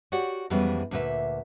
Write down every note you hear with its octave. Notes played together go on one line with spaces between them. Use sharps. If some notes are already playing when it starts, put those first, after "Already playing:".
F#4 G4 C#5 D5 F#5
F2 E3 G3 G#3 B3 C#4
D2 A#2 B4 E5